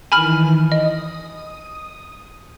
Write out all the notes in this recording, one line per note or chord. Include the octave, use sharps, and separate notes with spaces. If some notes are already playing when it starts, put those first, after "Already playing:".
D#3 E3 G#5 B5 F6
D#5 D#6